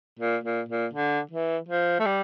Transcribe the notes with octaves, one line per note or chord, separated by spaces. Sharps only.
A#2
A#2
A#2
D3
E3
F3
A3
G3